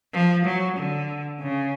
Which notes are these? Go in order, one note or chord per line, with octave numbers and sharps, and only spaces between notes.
F3
F#3
D3
C#3